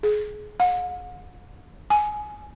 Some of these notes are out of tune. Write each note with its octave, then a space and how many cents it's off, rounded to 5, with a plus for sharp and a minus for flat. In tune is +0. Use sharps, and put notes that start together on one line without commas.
G#4 +20
F#5 -45
G#5 +15